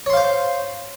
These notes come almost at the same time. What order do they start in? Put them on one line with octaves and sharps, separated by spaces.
C#5 C6 F5 C5